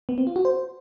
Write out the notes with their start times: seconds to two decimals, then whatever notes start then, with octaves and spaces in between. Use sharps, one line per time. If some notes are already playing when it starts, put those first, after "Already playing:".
0.09 B3
0.18 C4
0.27 F4
0.36 F#4
0.45 C5